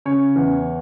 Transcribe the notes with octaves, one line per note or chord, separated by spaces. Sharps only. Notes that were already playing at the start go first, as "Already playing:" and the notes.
C#3 C#5
E2